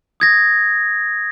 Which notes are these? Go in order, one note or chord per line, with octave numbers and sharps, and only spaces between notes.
D#6 G#6 A#6